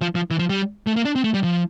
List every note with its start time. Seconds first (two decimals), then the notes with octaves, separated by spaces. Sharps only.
0.01 F3
0.15 F3
0.31 E3
0.39 F3
0.49 G3
0.87 A3
0.96 A#3
1.05 D4
1.15 C4
1.24 A3
1.34 G3
1.44 F3